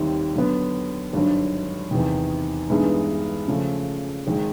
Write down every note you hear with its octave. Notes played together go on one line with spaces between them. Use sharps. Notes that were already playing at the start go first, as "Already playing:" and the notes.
Already playing: D#2 D#3 G3 C4 E4
D3 F#3 B3
G#1 G2 D3 F#3
E2 C3 D#3
G2 E3 G#3 B3 D#4
C#3 F3 A3
G#1 D#3 G#3